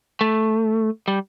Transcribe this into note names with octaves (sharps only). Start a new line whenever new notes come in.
A3
G3